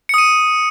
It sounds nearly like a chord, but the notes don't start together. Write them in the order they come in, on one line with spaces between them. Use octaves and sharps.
C#7 D#6 D#7